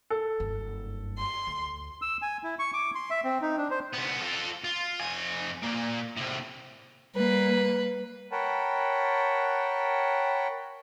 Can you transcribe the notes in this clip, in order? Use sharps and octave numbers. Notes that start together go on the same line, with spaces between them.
A4
F#1 G2
C6
D2
E6
G#5
E4
C#6
D6
C6
E5
C4
D#4
D4
C5
C2 B3
F4 A4
F4
F2 G#5
A#2 A#3
A2 C3
G3 A#3 B4
A#4 C#5 F#5 G5 A5 B5